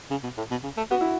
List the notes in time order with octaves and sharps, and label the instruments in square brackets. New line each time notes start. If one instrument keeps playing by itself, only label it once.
[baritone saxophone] C#3
B2
A2
B2
C#3
A3
[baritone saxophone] B3 [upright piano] F#4
[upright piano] E4